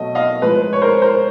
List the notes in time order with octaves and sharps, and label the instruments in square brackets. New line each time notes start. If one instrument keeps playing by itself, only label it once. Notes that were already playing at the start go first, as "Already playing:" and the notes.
Already playing: [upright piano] B2 F#3 A3 D#5
D#5 F5
A2 F3 G#3 B4
B4
C#5
A#4 C5
A#4 C5